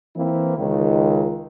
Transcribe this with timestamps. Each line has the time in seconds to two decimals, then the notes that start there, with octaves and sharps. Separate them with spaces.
0.16 E3 A#3 C4 E4
0.57 C#2 D#3